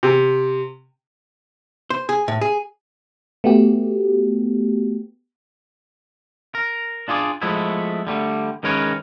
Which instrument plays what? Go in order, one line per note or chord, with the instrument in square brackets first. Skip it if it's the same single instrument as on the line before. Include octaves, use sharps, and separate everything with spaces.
[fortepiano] C3
[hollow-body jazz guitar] C5
G#4
A2
G#4
[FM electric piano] A3 B3 F#4 G4
[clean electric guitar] A#4
D4 F4 G#4 D5
F3 G#3 A3 B3 E4
D3 G3 A3
D#3 G#3 C#4 A#4 B4 C#5